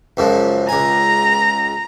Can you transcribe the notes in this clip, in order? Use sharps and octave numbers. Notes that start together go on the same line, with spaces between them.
C#2 F#2 F3
C#2 G#5 A#5